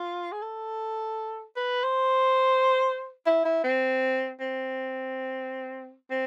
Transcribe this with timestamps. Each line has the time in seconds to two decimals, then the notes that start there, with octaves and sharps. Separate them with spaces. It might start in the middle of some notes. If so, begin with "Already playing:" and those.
Already playing: F4
0.32 G#4
0.42 A4
1.57 B4
1.84 C5
3.27 E4
3.45 E4
3.64 C4
4.40 C4
6.11 C4